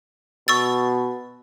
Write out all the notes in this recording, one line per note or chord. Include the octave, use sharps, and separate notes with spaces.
B2 C#6 E6 A6